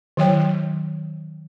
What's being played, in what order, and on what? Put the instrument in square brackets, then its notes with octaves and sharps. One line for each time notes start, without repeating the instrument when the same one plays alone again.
[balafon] D#3 F#3 C#5 G5